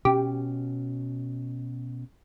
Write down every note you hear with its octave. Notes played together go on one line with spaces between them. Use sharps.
B2 C#4 G4